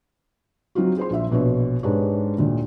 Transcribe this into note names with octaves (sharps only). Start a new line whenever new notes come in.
F#3 C4 D#4 F4 F#4
G#4 C5 C6
A#1 E5
A#1 B2 B4 C#5
G#2 D4 G4 B4 C#5
D2 A#2 D#3